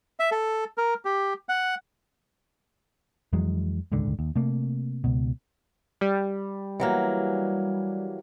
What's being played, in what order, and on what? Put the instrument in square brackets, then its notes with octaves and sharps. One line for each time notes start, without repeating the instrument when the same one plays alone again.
[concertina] E5
A4
A#4
G4
F#5
[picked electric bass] F2 E3 F#3 G#3
D#1 C#2 G#2 D3
D#2
C3 A3 A#3
C#2 B2
[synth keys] G3
[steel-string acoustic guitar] E3 F#3 A#3